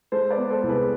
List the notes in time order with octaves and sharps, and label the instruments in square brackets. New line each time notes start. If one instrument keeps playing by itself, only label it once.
[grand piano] G#3 A4 C5
B4 D5
B3
A4 C5
C2
G#4 B4